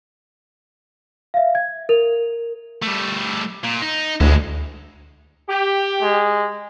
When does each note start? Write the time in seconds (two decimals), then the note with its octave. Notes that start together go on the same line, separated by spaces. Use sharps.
1.34 E5 F5
1.55 G#6
1.89 A#4 F7
2.83 G3 A3
3.64 A#2
3.81 D#4
4.21 D2 G#3 E4
5.49 G4
6.03 G#3